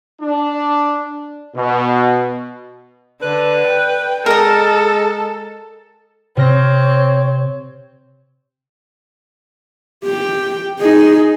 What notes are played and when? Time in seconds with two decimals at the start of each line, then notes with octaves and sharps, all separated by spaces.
0.21 D4
1.56 B2
3.22 D3 B4
3.67 G5
4.26 G#3 A4 A#4 D#5
6.37 C3 C4 C#5 F6 A#6
10.04 G4 G5
10.80 D#4 G#4